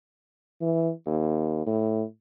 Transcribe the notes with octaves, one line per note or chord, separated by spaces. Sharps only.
E3
D#2
A2